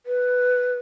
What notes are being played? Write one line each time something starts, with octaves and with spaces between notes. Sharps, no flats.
B4